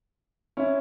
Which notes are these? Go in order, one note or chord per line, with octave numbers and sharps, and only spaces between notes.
C#4 E4